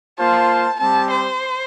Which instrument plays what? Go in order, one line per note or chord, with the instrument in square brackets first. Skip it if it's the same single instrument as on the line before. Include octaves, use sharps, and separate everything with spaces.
[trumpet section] A#3 F4 C5 [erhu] A5
[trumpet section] G3 C4 G4 [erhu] A5
[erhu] C5